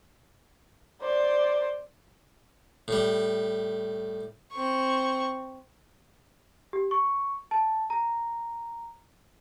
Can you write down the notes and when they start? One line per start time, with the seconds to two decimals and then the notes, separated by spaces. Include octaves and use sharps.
1.01 C5 D5
2.88 A2 G3
4.53 C4 C#6
6.73 G4
6.91 C#6
7.51 A5
7.90 A#5